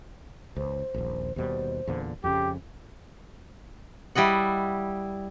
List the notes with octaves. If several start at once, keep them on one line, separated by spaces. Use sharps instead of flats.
C#2 C5
D#1 A#1
D#2 B2 G3 C5
E2 A#2 D3
F2 C#3 C#4 G4
G3 E4 D#5 F#5